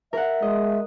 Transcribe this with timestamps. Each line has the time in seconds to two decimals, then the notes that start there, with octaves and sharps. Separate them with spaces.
0.13 A#4 E5 F#5
0.42 G#3 D#5